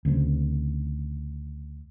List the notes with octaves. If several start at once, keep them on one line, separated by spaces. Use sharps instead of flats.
D2 C#3 G3 C4